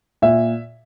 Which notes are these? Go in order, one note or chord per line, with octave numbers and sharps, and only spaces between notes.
A#2 E5